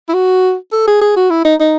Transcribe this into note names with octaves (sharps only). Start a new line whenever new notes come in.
E4
F#4
A4
G#4
G#4
F#4
E4
D#4
D#4